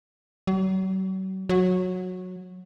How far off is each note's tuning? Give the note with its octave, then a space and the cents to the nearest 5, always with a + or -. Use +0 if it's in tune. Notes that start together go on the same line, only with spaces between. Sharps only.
F#3 +40
F#3 -15